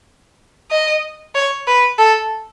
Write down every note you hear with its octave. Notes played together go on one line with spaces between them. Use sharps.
D#5
C#5
B4
A4